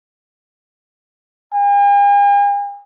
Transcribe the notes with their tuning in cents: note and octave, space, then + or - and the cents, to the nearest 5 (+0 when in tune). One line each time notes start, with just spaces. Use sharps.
G#5 -45